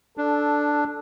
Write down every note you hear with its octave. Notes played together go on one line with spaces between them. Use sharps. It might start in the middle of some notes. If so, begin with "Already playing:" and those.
D4 A4